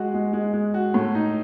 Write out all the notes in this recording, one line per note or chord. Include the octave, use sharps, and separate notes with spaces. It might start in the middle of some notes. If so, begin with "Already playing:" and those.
Already playing: G#3 F#4
G#3
G#3
G#3
F#4
A2
D#4